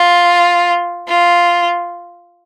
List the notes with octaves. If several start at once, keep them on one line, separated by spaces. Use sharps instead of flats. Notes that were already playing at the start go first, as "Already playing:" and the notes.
Already playing: F4
F4